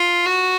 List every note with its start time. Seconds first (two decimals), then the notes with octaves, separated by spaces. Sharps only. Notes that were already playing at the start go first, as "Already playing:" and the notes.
Already playing: F4
0.26 F#4